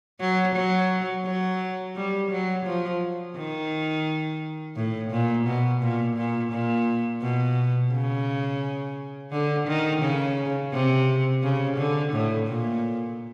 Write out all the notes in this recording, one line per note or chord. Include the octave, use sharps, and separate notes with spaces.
F#3
F#3
F#3
G3
F#3
F3
D#3
A2
A#2
B2
A#2
A#2
A#2
B2
C#3
D3
D#3
C#3
C3
C#3
D3
A2
A#2